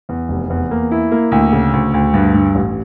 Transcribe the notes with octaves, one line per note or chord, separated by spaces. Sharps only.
E2
F1
E2
A#3
E4
A#3
D2
C#3
D2
D2
G2
G2
A1